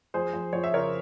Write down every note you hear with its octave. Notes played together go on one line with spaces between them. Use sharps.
F2 G#4 C5
F2
F2 C#5
E5
C#3 A#4 C#5